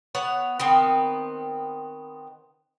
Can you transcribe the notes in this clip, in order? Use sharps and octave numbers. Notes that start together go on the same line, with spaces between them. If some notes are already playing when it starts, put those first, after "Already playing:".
B3 C#5 F#5
D#3 B3 C4